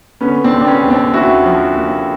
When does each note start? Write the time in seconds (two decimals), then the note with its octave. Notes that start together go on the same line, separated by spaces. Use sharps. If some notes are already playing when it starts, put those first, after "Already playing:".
0.21 D3 B3 C#4
0.44 C4 D4
0.52 D#2
0.61 D4
0.67 B3 C#4
0.84 D#2
0.90 C4 D4
1.14 D#2 E4 F#4
1.45 F3
1.76 D#2